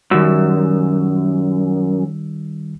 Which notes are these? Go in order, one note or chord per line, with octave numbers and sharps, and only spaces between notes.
F#2 D#3 G3 E6